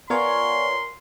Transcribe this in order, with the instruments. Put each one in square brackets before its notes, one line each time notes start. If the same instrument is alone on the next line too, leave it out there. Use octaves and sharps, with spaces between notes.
[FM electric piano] B3 F4 C#5 [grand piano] A#4 [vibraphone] D5 G#5 C#6 [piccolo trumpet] C6